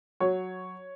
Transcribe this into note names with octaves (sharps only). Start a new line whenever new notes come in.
F#3 C#5